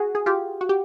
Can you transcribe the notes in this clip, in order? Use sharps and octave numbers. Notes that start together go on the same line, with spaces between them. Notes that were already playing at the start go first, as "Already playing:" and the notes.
Already playing: F#4 G#4
G#4
F4 G4
F#4
G4